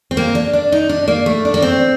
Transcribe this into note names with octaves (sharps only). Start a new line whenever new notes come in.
C4
A#3
D4
D4
D#4
D4
A#3
A3
D4
A#3
C4